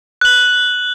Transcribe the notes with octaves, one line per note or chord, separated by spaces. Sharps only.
F#6 F#7